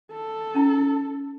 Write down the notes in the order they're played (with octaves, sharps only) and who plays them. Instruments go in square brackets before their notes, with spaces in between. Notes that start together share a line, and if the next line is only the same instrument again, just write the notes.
[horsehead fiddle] A4
[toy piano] C#4 D#4 E4